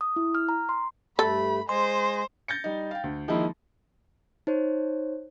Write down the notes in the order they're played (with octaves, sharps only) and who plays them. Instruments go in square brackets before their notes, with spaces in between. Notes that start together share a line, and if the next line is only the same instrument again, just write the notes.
[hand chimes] D#6
E4
F6
A#5
C6
[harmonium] G2 A3 [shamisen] A4 [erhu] B5
[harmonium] G#3 D#5 G#5 [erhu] C5 [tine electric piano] C6
[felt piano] G6 A6 A#6 C#7
G3 D#4
F5 G5
D2
D#3 F3 G#3 A#3 D#4 E4
[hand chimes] D#4 C5 C#5